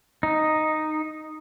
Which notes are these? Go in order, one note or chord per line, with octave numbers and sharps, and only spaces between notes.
D#4